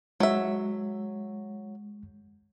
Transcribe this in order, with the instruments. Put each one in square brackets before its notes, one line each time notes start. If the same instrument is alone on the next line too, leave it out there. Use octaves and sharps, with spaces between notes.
[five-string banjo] F#3 E5 [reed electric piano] G#3